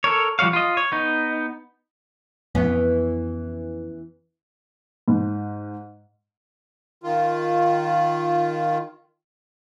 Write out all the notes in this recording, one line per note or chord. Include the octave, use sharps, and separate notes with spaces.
A4 A#4 C#5
F3 G3 F#4 C#5 F5
F4 D#5
C#5
B3 D#4
F2 E3 B3 C#4
G#2
D#3 F4